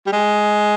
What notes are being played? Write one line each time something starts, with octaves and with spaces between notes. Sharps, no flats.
G3
G#3